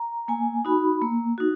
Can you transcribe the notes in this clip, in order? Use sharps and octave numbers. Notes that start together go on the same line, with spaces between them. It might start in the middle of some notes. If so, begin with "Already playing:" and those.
Already playing: A#5
A#3 G#5
D#4 F#4 B5
A#3
D#4 F#4